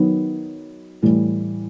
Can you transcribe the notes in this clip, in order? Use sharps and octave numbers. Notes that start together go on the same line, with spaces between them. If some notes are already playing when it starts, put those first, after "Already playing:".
Already playing: D#3 F#3 B3 D#4
A2 E3 G3